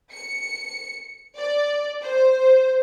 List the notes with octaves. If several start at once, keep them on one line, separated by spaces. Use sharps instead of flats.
C#7
D5
C5